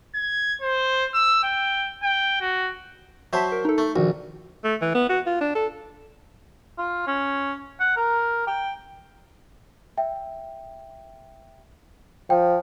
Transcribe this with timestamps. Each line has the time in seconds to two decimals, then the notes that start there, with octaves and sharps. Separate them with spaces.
0.15 G#6
0.61 C5
1.14 E6
1.43 G5
2.03 G5
2.41 F#4
3.33 F#3 C5 E5 A5 B6
3.52 A#4
3.65 D#4 A4
3.78 A3
3.96 A#1 D#3 F#4
4.64 A3
4.81 E3
4.94 B3
5.09 F#4
5.26 F4
5.41 D4
5.55 A4
6.78 F4
7.07 C#4
7.80 F#5
7.96 A#4
8.47 G5
9.98 E5 G5
12.30 F3 G5